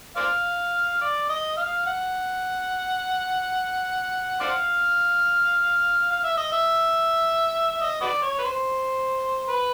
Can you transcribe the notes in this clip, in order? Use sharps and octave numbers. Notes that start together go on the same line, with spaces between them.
C5 D5 F5
D5
D#5
F5
F#5
C5 D5 F5
F5
E5
D#5
E5
D#5
F#4 B4 D5
C#5
B4
C5
B4